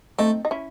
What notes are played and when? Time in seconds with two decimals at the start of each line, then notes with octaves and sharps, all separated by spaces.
0.18 A3 C4 D#4
0.45 D#4
0.51 C#4 E4